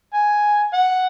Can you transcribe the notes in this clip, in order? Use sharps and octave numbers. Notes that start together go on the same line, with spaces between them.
G#5
F#5